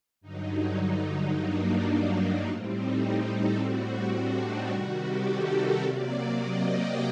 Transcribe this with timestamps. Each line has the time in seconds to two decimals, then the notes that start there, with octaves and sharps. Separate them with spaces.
0.21 G2 D3 F#3 D#4
0.77 D#4
1.33 G2 F#3 A#3 D4 D#4
1.90 D#4
2.46 A2 G3 C4
2.73 D#4
3.29 A4
3.57 A2 G3 C4 F#4
4.14 D4
4.42 D#4
4.69 C3 D#3 G3 F#4
4.98 G4
5.26 A4
5.54 A#4
5.81 C3 F#3 A#3 D5
6.38 D#5
6.66 G5